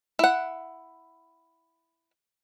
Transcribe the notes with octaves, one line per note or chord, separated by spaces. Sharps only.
E4 F#5